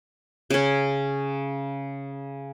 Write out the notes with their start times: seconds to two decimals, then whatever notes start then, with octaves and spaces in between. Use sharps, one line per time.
0.50 C#3 C#4